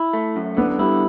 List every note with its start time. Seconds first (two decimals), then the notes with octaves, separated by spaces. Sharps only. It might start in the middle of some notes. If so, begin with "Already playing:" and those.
Already playing: E4
0.13 A3
0.36 F#2
0.57 D3 B3
0.79 G3 E4